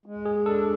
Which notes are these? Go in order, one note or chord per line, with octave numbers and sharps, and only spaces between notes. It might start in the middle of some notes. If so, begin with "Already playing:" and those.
G#3
G#4
D4 A4